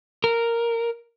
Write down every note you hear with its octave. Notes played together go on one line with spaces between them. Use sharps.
A#4